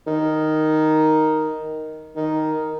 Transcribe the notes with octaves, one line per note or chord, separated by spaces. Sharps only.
D#3
D#3